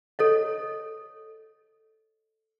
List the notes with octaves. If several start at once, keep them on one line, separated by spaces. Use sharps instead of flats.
A4 C#5 D#5